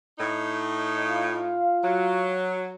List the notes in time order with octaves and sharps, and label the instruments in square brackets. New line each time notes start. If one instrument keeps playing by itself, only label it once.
[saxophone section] A2 D#4
[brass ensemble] F4 F5
[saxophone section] F#3